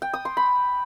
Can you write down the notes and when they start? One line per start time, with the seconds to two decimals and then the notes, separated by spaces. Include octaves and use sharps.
0.02 G5
0.14 D#6
0.25 C6
0.37 B5